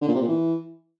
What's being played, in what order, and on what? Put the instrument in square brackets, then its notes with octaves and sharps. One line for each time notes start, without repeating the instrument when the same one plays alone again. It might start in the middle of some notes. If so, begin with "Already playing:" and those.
[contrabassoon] D3
A#2
C3
A#2
E3